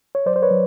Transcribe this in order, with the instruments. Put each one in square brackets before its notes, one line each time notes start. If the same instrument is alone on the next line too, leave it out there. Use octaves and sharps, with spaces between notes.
[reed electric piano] C#5
F#3 C5 D5
C5
B4 C#5
F#3